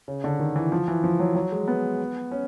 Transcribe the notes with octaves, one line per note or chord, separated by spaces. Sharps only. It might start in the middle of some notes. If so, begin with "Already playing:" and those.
C#3
D3
D#3
E3
F3
E3
F3
F#3
F#3
G#3
B3
C#4